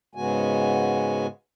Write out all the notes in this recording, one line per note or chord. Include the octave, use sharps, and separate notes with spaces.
G#2 C#3 G#3 B3 F#4 G#5